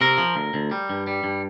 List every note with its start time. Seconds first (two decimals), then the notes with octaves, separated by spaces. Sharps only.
0.01 C3 A#4
0.18 F3
0.36 D2
0.54 D2
0.71 G3
0.90 G2
1.07 G3
1.24 G2